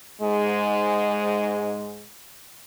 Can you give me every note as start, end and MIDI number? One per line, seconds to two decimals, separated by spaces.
0.21 2.05 44
0.21 2.05 56